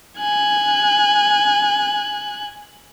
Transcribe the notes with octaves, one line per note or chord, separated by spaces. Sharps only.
G#5 F#6